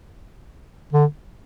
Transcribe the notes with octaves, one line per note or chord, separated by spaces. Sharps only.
D3